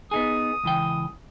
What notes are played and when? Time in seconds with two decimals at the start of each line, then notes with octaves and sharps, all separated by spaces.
0.11 B3 D#4 G#4 D#6
0.64 C#2 E3 G5